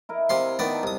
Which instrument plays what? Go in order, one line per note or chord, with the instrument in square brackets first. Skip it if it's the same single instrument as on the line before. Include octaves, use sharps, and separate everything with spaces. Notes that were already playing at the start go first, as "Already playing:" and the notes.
[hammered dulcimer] E4 A#4 D#5
[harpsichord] C3 F5 C6
D#3 B3 D5
[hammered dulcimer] D#4 A5
[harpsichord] C2 D#6